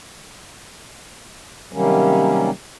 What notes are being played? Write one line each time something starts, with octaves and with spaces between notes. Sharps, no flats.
C3 D#3 F#3 G3 A#3 C#4